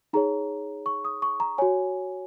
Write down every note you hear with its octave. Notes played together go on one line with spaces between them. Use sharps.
D#4 G#4 C#5 A#5
C#6
D#6
C#6
A#5
F#4 C#5 G#5